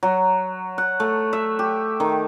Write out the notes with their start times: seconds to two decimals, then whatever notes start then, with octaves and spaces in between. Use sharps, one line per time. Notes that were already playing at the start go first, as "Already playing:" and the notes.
0.03 F#3
0.78 F#5
1.00 A3
1.33 E5
1.59 G4
2.00 D#3